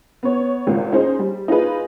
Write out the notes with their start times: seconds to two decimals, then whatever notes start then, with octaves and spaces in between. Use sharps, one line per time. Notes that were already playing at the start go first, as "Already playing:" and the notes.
0.23 B3 C#5
0.67 G#1 C#2
0.92 C#4 D#4 G#4 C5
1.19 G3
1.48 D#4 F4 G#4 B4